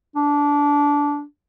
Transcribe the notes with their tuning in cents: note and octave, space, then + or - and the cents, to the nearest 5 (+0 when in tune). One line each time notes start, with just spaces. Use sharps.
D4 -20